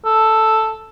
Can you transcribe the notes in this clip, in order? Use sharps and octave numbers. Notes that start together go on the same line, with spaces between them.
A4